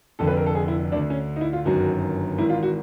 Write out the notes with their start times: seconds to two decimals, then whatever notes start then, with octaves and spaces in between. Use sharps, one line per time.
0.19 F1 F2 D3 A4
0.28 B4
0.37 A#4
0.46 A4
0.55 G#4
0.68 E4
0.92 D2 D3 D4
1.10 C#4
1.36 D#4
1.41 E4
1.53 F4
1.65 G1 F#2 D#3 F#4
2.38 G#1 G#2 E3 E4
2.50 F4
2.63 F#4